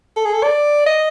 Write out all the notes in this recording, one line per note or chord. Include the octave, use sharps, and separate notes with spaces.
A4
G#4
A4
D5
D#5